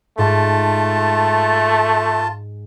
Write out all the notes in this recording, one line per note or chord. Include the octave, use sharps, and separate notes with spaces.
G#2 A3 F4 A5